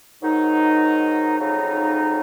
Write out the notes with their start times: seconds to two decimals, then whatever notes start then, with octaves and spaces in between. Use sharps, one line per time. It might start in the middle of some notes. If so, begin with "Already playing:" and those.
0.22 G#2 D#3 F#3 D#4
1.38 F2 C#3 F#3 D#4